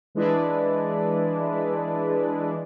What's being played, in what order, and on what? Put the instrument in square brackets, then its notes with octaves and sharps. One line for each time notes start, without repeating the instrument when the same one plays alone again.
[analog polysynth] E3 G#3 D4 E4 B4 D5